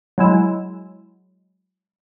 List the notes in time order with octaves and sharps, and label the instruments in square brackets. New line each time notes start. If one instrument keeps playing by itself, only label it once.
[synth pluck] F#3 G#3 E4